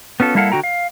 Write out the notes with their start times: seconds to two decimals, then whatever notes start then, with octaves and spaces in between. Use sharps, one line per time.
0.20 B3 C#4 F4 A4
0.35 G3 A#3 E4 A4 F5 F#5
0.52 D3 F#4 G5 A#5
0.63 F5